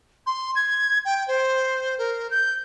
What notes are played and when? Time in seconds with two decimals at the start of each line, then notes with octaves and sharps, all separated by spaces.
0.26 C6
0.56 G#6
1.05 G5
1.28 C5
1.98 A#4
2.31 G6